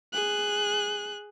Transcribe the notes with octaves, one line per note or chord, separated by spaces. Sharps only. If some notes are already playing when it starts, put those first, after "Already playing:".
G#4 F#6